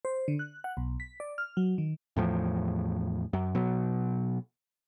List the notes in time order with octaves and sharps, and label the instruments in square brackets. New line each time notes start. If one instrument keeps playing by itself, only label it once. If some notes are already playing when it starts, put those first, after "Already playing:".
[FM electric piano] C5
D3
F#6
F#5
B1
B6
D5
F6
F#3
D#3
[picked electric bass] E2 A2 F3
F#2
B2 F#3